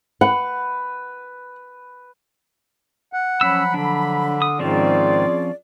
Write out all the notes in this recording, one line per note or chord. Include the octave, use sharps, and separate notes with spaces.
B4 F#5
F#5
F3 F#3 C#4 B5 E6
D3 D4
D#6
G#2 D#3 F3 C4 C#4 F4 G#4 D5